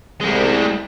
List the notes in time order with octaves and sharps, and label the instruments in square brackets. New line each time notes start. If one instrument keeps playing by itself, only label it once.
[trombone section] C2 [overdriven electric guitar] G3 G#3